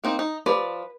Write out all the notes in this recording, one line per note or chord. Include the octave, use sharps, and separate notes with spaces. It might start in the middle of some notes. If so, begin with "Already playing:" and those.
A#3 C4 D#4
D#4
F3 B4 D5